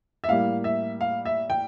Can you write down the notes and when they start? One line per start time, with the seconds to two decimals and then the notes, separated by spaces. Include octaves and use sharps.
0.24 E5
0.28 A2 G3 A#3 F5
0.64 E5
1.01 F5
1.25 E5
1.50 G5